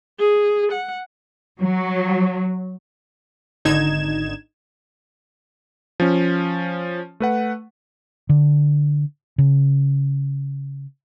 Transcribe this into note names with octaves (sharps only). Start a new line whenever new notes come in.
G#4
F#5
F#3
G#1 D3 D#4 G#6 E7
F3 C#4
A3 B4 F#5
D3
C#3